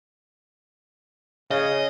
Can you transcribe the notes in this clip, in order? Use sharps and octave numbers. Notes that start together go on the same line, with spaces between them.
C#3 D#5